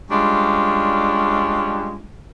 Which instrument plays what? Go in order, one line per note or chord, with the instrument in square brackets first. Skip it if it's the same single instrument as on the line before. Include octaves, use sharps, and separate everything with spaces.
[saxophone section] G3 G#3 C#4 D4 F4